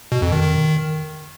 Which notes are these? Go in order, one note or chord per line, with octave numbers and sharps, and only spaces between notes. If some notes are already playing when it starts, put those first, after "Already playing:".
B2
F2
D#3
D#3